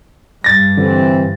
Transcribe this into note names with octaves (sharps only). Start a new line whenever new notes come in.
G2 A6 A#6
D3 E3 C4